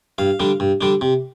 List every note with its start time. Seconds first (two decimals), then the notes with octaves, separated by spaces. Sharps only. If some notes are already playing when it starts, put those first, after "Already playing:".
0.18 G2 F5
0.40 D3 G3 D4
0.60 G2
0.81 D3 G3 D4
1.01 C3